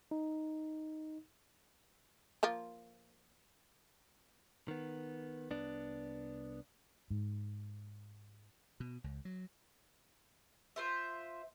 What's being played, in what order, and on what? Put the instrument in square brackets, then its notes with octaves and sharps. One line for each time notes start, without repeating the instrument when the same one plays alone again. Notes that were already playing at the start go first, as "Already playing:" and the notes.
[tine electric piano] D#4
[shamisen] F3 A#3 F4
[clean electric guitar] D#3 B3
C2 B3 D4
[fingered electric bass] G#2
[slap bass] B2
C#2
F#3
[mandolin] F4 C5 E5